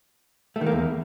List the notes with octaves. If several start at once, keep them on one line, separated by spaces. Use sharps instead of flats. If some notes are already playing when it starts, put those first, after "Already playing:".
A3
D#3
A#3
E2